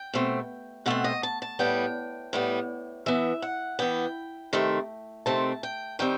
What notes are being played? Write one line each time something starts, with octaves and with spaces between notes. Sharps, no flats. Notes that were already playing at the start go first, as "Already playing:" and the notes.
Already playing: G5
B2 A3 C4
B2 A3 C4 F#5
D#5
A5
A5
A2 G3 B3 G5
A2 G3 B3
E3 B3 E5
F#5
E3 B3 G5
C3 D#3 A3 C4
C3 D#3 A3 C4 A5
G5
D#3 G3 C4 G5